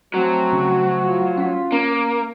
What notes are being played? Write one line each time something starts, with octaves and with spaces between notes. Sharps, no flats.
F3 F#3 A3 C4 F#4
C#3
F4
C#4 F#5 B6
A#3 C#4